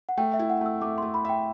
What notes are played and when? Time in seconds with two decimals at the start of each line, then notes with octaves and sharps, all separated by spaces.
0.09 F#5
0.17 A3 G5
0.34 E5
0.39 E4
0.50 F#5
0.61 A3 E6
0.81 A3 D6
0.98 A3 C6
1.14 B5
1.25 E5 G5